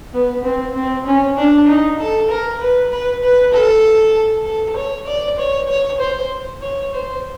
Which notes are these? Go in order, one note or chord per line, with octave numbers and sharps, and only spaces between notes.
B3
C4
C4
C#4
D4
D#4
A4
A#4
B4
B4
B4
A4
A4
C#5
D5
C#5
C#5
C5
C#5
C5